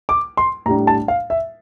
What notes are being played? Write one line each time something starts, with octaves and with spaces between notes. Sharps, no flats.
D6
C6
A2 G3 D4 A#5
A5
F5
E5